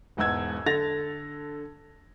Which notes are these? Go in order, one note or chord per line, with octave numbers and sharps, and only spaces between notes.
E1 E2 G#2 F#5 E6 G#6
D3 A4 A6 A#6 F7